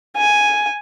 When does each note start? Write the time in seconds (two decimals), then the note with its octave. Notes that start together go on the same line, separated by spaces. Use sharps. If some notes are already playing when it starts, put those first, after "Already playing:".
0.17 G#5